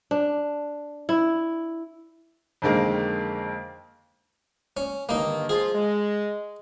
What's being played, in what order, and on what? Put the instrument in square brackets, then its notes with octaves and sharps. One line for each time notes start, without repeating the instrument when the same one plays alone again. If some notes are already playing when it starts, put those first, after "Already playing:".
[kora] D4
E4
[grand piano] F2 D3 D#3 G#3 A#3
[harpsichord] C#4
[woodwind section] G2 D3 D#3 [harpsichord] A#3 D#4
[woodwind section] F3 A#3 F4 [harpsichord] G#4
[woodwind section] G#3